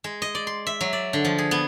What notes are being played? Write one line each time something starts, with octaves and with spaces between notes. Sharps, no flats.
G#3
D#5
D5
C6
E5
F#3
D5
D3
F3
G#4
B3